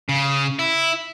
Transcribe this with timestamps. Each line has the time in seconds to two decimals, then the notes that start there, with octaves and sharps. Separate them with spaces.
0.09 C#3
0.59 E4